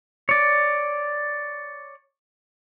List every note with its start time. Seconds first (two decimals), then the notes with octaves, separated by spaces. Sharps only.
0.29 C#5 D5